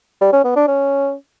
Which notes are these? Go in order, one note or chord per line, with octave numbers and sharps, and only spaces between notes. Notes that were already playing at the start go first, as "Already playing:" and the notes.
G3
C#4
B3
D4
C#4